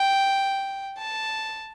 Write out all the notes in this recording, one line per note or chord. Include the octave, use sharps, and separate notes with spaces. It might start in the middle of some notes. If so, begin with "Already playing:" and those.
Already playing: G5
A5